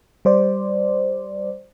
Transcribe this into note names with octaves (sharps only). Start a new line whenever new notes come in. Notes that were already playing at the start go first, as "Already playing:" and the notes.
G3 C5 D5